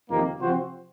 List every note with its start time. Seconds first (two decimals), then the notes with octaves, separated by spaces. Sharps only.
0.09 F2 C3 D#3 A#3
0.40 C3 F3 C4 F#4 C5